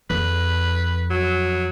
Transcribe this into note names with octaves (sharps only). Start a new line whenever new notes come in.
F2 B4
F#3